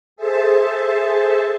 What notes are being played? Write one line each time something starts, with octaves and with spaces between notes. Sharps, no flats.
G#4 A4 C5 E5 A5